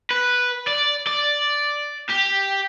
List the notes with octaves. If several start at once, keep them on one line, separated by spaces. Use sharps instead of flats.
B4
D5
D5
G4